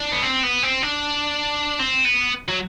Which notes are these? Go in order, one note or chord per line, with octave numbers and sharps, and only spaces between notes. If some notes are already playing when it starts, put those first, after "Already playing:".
Already playing: D4
B3
C4
B3
C4
D4
C4
B3
F#3